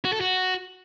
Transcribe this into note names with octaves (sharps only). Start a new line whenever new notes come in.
F#4
A4
F#4